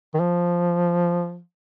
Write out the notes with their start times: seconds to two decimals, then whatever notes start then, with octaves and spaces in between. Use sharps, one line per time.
0.14 D#3
0.20 F3